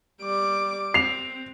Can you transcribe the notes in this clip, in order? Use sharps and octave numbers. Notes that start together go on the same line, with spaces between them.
G3 D6
C4 C7 F7